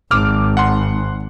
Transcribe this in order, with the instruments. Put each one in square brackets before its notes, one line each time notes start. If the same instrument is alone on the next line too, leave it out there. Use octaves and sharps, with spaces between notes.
[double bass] G#1 [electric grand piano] D6 F6
[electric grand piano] F#5 C6